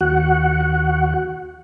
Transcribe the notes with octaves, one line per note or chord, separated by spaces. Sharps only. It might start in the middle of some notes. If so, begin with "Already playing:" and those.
D#2 F#4 F#5